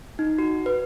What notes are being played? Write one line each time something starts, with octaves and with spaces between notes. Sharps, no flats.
D#4
F#4
B4